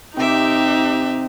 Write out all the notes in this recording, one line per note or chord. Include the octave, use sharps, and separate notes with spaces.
C3 D#4 G4 C5 E5 D6